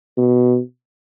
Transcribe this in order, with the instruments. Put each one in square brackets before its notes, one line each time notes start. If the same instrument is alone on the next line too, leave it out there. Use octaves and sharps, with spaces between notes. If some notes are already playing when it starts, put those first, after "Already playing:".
[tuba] B2